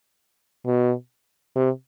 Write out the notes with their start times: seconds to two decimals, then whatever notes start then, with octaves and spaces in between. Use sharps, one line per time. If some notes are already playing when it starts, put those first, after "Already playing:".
0.66 B2
1.55 C3